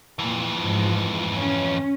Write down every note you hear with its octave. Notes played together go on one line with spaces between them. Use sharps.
F2 A#2 E3
G#2 F3
C#4